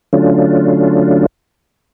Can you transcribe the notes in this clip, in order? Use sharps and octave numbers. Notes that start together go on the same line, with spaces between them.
D3 F#3 A3 C#4 D4 F4